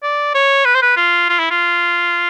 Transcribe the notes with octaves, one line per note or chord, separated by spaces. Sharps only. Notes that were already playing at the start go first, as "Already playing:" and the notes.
D5
C#5
B4
C5
B4
F4
F4
E4
F4